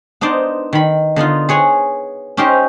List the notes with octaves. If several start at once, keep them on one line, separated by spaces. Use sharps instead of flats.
B3 D4 D#4 C5 D5
D#3 B5
D3 B3 D#4 F4
G#4 C#5 F#5 G#5
C#4 D#4 G4 A#4 C5